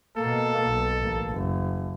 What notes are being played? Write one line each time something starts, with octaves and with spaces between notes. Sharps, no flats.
B2 A#3 A4
B1
A1 A#3
F#1